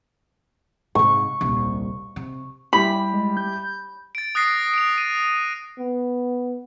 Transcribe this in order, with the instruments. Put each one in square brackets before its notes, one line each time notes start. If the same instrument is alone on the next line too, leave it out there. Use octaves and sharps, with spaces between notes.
[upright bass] G#2 C3 [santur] C#6
[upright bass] D#1 C2
C3
[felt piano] G3 E4 G4 [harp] B5
[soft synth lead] G#3
G6
[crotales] A6 D7
D#6 F#6 A6 A#6 C7 D7
D7 F7
D#7
[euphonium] B3